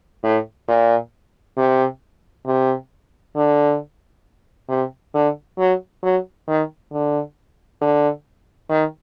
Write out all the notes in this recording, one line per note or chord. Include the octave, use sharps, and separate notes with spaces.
A2
A#2
C3
C3
D3
C3
D3
F#3
F#3
D#3
D3
D3
D#3